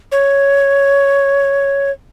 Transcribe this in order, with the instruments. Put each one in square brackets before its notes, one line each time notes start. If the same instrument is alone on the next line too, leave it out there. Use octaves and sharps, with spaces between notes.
[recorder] C#5